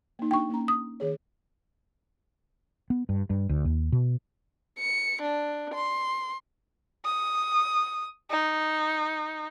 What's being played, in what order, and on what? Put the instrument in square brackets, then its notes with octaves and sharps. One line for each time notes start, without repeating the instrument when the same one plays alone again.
[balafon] A#3 D#4
[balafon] D4 G4 [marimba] G5 C#6
[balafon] A#3 C#4 A#5
[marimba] D#6
[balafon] D#3 G#4 C#5
[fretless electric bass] B3
G2
G2
D2
D#2
B2
[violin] C#7
D4
C6
[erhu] D#6
D#4